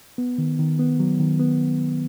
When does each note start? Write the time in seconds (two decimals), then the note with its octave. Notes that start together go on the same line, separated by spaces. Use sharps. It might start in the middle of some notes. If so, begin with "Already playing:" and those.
0.18 B3
0.38 D#3
0.59 D#3
0.79 B3
1.00 F#3
1.20 D#3
1.39 B3